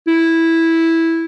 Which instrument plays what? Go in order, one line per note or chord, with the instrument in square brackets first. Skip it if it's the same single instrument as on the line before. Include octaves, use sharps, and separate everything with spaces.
[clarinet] E4